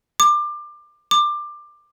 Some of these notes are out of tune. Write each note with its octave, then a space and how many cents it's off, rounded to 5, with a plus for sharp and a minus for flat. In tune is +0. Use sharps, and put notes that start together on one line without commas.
D6 +25
D6 +20